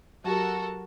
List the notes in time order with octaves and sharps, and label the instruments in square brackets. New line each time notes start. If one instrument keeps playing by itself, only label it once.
[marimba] F#3 G4 [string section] F#4 A4 [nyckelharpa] A#4 A5